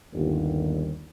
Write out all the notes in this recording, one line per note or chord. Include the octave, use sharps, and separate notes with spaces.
G1 D#2